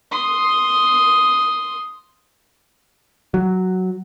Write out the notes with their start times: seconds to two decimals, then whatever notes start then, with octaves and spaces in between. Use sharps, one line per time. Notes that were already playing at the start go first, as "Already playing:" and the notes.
0.11 C6 D#6
3.34 F#3